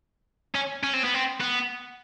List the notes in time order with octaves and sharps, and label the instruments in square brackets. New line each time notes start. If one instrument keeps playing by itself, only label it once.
[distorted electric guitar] C#4
C#4
C4
B3
C4
B3